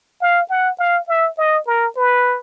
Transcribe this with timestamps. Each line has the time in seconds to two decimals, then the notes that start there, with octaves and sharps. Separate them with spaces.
0.22 F5
0.50 F#5
0.79 F5
1.08 E5
1.38 D#5
1.67 A#4
1.96 B4